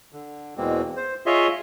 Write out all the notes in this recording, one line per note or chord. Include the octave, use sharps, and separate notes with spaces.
D3
E2 B2 G#3 A#3 C4
C5
F4 G#4 C#5 D#5 E5 C6